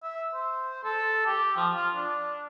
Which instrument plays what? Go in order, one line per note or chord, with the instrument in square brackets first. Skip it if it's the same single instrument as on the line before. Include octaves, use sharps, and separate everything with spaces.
[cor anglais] E5
C5
A4
G4
F3
F4
D4